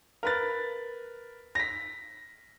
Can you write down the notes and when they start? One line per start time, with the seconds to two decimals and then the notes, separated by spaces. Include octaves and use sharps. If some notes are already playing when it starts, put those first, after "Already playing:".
0.23 A#4 B4 A6
1.55 A#6 B6